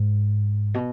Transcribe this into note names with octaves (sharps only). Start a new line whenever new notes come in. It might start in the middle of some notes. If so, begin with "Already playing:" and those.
Already playing: G#2
B2